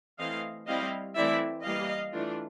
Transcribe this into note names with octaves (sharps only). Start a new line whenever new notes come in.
E3 A3 C4 D#5 F5
G3 C4 E4 D#5 F5
E3 A3 C4 E4 D5 E5
E3 G3 A#3 D#5 F5
E3 A3 D4 F4